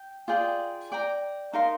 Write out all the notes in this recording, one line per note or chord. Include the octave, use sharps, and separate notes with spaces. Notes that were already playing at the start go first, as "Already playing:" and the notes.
Already playing: G5
F4 G#4 D5 G5
D5 G5 A#5
D#4 A#4 F5 C6